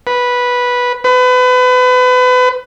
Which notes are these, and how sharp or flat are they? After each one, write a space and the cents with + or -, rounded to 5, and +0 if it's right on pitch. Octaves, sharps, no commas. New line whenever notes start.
B4 -10
B4 +30